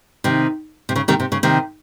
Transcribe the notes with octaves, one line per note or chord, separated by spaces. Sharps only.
C3 D#3
C3
C#3
C3 D#3
C3
C#3
C3 D#3